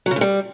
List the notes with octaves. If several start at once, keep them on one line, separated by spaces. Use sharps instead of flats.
F#3
C#3
G#2
G3